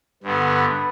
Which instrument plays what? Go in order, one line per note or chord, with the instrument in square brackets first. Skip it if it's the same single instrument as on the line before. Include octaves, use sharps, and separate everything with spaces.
[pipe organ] G2 D3 B3 [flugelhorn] B4